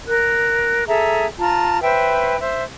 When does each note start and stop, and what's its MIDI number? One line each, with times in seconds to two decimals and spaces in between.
0.07 0.84 70
0.07 0.84 90
0.87 1.26 68
0.87 1.26 69
0.87 1.26 76
0.87 1.26 82
1.38 1.81 65
1.38 1.81 81
1.38 1.81 82
1.82 2.37 71
1.82 2.37 72
1.82 2.37 76
1.82 2.37 79
2.40 2.62 72
2.40 2.62 76